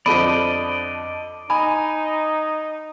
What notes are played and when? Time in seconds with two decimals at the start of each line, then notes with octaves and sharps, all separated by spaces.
0.06 F2 D3 F3 D5 D#5 B5
1.50 D#4 G#5 B5